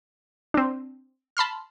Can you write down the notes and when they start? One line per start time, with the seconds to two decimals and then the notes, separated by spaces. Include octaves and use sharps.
0.54 C4 D4
1.37 A5 B5 C6 F6